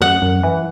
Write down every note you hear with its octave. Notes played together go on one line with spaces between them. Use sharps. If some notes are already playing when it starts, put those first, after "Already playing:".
F#2 F#5
F#2
E3